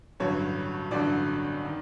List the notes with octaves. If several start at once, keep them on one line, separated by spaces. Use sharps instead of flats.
A1 G2 D3 F#3 C#5
A1 G2 D3 F#3 D5
D#3